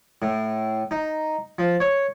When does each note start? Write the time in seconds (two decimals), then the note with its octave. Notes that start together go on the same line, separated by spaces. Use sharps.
0.22 A2
0.91 D#4
1.59 F3
1.80 C#5